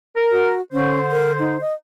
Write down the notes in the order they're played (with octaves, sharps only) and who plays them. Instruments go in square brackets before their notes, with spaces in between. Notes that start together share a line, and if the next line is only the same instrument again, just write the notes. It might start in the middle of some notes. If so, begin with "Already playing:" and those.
[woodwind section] A#4
[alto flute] F#4
[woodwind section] D3 C5 [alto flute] C#4
[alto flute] A#4
D#4
D#5